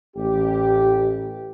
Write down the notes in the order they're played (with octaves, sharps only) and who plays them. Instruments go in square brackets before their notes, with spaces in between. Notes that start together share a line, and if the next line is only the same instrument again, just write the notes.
[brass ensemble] A1 G4